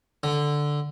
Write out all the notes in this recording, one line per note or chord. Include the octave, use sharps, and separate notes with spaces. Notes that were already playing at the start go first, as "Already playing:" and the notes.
D3